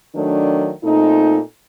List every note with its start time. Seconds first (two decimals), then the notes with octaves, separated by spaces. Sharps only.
0.14 D#3 F#3 A3 D4
0.84 A#2 A3 C4 D#4